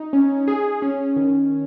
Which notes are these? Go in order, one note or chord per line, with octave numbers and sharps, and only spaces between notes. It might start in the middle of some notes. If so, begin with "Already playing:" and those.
Already playing: D#4
C#4
G#4
C#4
D#3